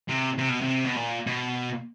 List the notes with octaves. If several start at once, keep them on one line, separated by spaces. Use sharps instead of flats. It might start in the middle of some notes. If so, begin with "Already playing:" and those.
C3
C3
B2
C3
B2
A#2
B2